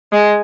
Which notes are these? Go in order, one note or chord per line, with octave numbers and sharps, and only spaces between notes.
G#3